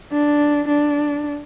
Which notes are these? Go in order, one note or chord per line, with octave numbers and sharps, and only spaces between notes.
D4
D4